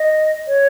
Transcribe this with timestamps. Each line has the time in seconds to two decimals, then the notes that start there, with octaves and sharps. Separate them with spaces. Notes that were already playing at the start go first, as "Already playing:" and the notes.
Already playing: D#5
0.48 C#5